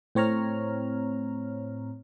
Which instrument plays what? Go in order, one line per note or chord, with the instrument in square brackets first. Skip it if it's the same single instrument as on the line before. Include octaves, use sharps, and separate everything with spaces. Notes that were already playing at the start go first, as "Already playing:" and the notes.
[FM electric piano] A2 C4 C#5 A#5 F6